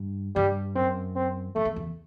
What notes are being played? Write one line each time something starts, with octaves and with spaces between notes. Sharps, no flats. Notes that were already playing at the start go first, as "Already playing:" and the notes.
Already playing: G2
G2 G3
F#2 C4
C4
F#2 A3
E2
E2